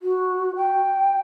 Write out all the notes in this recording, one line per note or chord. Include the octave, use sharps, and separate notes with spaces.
F#4
G5